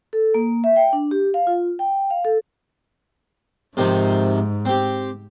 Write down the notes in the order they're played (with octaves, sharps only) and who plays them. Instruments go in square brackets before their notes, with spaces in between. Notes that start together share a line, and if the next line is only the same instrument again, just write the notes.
[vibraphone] A4
A#3
E5
G5
D4
G4
F5
F4
G5
F5
A4
[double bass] G#2 [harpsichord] C3 D#3 F3
[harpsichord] C4 G4